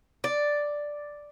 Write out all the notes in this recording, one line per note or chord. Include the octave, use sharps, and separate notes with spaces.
D5